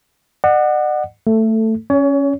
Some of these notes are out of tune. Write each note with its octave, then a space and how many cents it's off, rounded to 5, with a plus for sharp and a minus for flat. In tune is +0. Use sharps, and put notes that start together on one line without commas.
D5 +45 F#5 +0
A3 +15 A4 +0
C#4 +0 C#5 +30